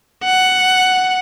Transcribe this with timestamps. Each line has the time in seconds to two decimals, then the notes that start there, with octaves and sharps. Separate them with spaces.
0.24 F#5